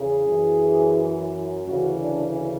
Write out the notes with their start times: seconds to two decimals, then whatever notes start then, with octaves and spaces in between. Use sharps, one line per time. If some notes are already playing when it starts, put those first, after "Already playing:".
Already playing: E2 C#3 G#4
0.27 F#2 E3
1.64 D2 C#3 E3 F#4
1.98 D4